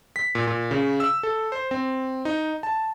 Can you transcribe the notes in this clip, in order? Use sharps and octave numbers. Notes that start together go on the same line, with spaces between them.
B6
A#2
A#2
C#3
E6
A4
C5
C4
D#4
A5